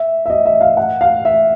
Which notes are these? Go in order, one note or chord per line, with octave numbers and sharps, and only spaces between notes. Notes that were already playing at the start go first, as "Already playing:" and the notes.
Already playing: E5
E5
D#5
E5
F5
F#5
F5
E5